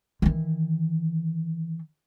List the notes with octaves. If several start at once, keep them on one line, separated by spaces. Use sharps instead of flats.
D#3 E3